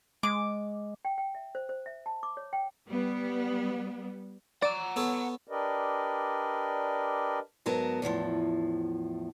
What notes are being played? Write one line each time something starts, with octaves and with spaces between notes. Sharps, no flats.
G#3 D6
G5
G5
E5
C5
C5
E5
A5
D6
C#5
G5
G3 B3
D5 F#5 A#5
B3 A4 C#5
D4 G4 A#4 B4 D5 D#5
G#2 F#3 B3 A#4 A5
E2 A2 E3 F3